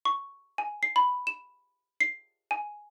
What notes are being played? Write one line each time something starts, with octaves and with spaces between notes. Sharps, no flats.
C#6
G#5
C7
B5
E7
C7
G#5